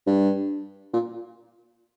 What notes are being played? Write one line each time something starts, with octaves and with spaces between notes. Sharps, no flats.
G2
A#2